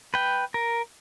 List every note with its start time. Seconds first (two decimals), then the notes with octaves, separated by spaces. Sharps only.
0.14 B4 G5
0.54 A#4